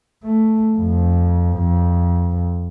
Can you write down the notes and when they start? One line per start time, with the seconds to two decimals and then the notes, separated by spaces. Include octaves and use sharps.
0.23 A3
0.78 F2
1.57 F2